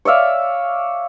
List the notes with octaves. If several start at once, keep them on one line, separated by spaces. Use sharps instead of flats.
C#5 D5 E5 F5